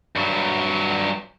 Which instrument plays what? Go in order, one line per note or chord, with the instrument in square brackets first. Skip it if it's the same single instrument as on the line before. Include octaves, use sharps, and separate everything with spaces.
[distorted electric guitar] G2 F#3